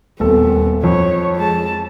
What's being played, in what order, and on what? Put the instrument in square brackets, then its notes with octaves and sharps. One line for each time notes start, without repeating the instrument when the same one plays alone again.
[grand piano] D#1 A4 [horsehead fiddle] B3 C4
[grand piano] F2 [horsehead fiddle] C#5
[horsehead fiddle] G#3 A5